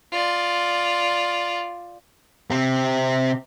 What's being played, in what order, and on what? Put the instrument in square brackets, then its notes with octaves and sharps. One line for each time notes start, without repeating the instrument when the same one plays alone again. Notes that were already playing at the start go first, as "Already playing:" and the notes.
[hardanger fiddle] F4 D5
[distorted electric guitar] C3 C4